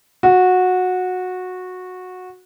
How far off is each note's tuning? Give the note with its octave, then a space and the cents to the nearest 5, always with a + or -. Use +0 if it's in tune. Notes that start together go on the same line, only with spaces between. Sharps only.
F#4 -15